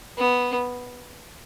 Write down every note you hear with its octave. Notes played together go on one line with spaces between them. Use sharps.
B3